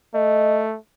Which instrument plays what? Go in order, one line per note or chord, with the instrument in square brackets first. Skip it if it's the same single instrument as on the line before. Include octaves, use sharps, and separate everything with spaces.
[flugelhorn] A3 [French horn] D#5